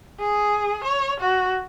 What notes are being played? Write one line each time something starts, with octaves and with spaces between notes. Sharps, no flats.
G#4
C#5
F#4